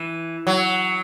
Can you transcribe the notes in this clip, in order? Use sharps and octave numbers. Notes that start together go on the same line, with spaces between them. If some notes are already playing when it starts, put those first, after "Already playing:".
Already playing: E3
F#3